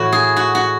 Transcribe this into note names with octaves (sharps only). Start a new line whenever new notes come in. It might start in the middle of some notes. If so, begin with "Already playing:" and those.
Already playing: A2 E3 F#4
G#4
F#4
F#4